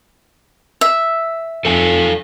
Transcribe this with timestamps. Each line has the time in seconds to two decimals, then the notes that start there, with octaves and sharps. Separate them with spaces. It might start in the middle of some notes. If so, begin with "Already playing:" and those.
0.81 E5
1.65 F2 A4 F5 G#5